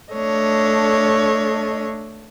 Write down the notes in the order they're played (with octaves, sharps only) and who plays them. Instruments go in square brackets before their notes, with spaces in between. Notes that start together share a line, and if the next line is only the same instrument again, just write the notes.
[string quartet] A3 D4 A4 C#5 D#5